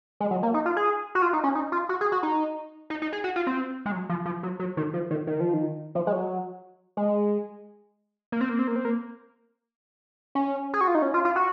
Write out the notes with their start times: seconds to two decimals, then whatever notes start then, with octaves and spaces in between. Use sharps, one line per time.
0.20 G#3
0.31 F#3
0.43 A#3
0.54 D#4
0.66 F4
0.77 G#4
1.15 F#4
1.22 F4
1.33 D#4
1.44 C#4
1.55 D#4
1.72 F4
1.89 F#4
2.01 G#4
2.12 F#4
2.23 D#4
2.90 D#4
3.02 D#4
3.13 G#4
3.24 F#4
3.36 F4
3.47 C4
3.86 G#3
3.92 F#3
4.09 F3
4.26 F3
4.43 F#3
4.60 F#3
4.77 D#3
4.94 F3
5.11 D#3
5.27 D#3
5.40 F3
5.54 D#3
5.95 F3
6.07 G#3
6.12 F#3
6.97 G#3
8.32 A#3
8.41 C4
8.49 A#3
8.59 C4
8.68 A#3
8.76 C4
8.85 A#3
10.35 C#4
10.74 G#4
10.81 F#4
10.88 F4
10.95 D#4
11.02 C#4
11.14 F4
11.25 F4
11.36 F#4